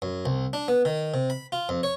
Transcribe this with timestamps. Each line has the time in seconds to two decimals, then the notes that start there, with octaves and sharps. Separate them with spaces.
0.02 F#2
0.26 C2
0.53 D4
0.68 B3
0.85 D#3
1.14 C3
1.30 B5
1.52 F4
1.69 F2
1.83 C#5